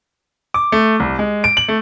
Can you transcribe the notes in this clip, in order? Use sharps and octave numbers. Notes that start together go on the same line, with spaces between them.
D6
A3
C2
G#3
D7
F#7
A3